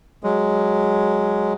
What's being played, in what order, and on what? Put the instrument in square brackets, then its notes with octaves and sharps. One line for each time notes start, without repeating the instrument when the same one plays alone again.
[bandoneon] F#3 G#3